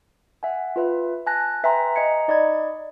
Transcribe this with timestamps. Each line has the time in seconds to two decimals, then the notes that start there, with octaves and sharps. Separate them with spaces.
0.43 E5 F#5 G#5
0.76 F4 B4 E5
1.27 G#5 A5 F#6 A#6
1.63 B4 E5 G5 G#5 A#5 C6
1.96 D#5 G#5 A#5 G#6 C#7
2.28 D#4 D5 D#5 B5 G#6